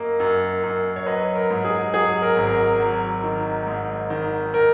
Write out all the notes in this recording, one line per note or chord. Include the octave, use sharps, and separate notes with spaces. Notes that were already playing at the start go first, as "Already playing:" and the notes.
Already playing: F#2 A#3 D#5
F#2
F#2
C#5
F#3 B4 D#5
A#4
G#2
G#4
F#3 G#4
A#4
G#1
A#4
F#3
D#3
G#2
D#3
A#4